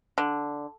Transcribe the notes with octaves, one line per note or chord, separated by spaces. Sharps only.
D3